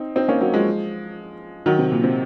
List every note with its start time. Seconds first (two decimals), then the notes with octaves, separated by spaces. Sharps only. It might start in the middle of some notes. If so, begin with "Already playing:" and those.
Already playing: C4 D#4
0.16 C4 D#4
0.29 A#3 C#4
0.41 F#3 A#3
0.54 F3 G#3
1.66 D#3 F#3
1.79 C3
1.92 A#2
2.04 C3